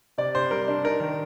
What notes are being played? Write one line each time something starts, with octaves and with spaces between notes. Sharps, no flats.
C3 D5
C3 C5
G3 A#4
D4
D#4 A#4
D#3